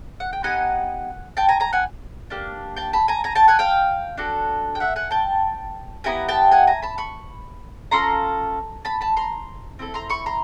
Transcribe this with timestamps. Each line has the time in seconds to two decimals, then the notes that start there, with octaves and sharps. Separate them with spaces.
0.20 F#5
0.33 G5
0.43 B3 D#4 G4 F#5 G#5
1.37 G5 A5
1.49 G#5 A#5
1.60 G#5 A#5
1.73 F#5 G#5
2.30 A#3 D4 G4
2.77 G5 A5
2.93 A5 B5
3.08 G#5 A#5
3.24 G#5 A#5
3.35 G5 A5
3.48 F#5 G#5
3.59 F5 G5
4.17 D4 F#4 A4
4.75 G5
4.80 E5 F#5
4.96 F#5 G#5
5.11 G5 A5
6.04 B3 E4 G4 G#5 A#5
6.29 G5 A5
6.51 F#5 G#5
6.67 G#5 A#5
6.82 A5 B5
6.98 B5 C#6
7.91 C#4 F4 A4 A#5 C6
8.85 A5 B5
9.01 A5 B5
9.16 A#5 C6
9.79 C4 E4 A4
9.94 A#5 C6
10.10 B5 C#6
10.26 A#5 C6